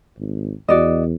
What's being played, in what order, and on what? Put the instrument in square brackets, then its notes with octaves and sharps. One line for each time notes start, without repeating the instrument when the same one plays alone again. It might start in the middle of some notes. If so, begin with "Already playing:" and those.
[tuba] G#1
[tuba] E2 [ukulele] F#4 D5 D#5